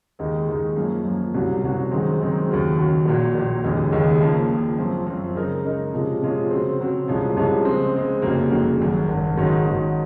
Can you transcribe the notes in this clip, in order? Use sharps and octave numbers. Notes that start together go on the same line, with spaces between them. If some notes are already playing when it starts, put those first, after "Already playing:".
D#2 D#3 G#3 D#4
D#2 D#3 G#3 D#4
F#2 F3 A#3
F#2 F3 A#3
C2 C3 F#3 C#4 F#4
C2 C3 F#3 C#4 F#4
F#2 D#3 G#3 C4
F#2 D#3 G#3 C4
D#2 C#3 F#3
D#2 C#3 F#3
A#1 A#2 F#3
A#1 A#2 F#3
F1 D#2 C#3 G#3 C#4
F1 D#2 C#3 G#3 C#4
C#3 F3 A#3
C#3 F3 A#3
F#2 F3 C4
F#2 F3 C4
C#3 G#3 D#4 A#4
C#3 G#3 D#4 A#4
C3 F3 G#3 C#4 F4
C3 F3 G#3 C#4 F4
C#3 F#3 C4
C#3 F#3 C4
C2 C3 F3 G#3 C#4
C2 C3 F3 G#3 C#4
C#3 G#3 C4
C#3 G#3 C4
F1 F2 C#3 F#3 A#3
F1 F2 C#3 F#3 A#3
G#1 F#2 C#3
G#1 F#2 C#3
G#2 D#3 F#3 C#4
G#2 D#3 F#3 C#4